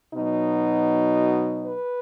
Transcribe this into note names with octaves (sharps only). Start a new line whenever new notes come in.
B2 F#3 D#4
B4